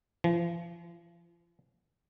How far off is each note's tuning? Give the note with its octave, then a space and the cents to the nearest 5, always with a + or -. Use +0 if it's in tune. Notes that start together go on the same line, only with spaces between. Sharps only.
F3 -40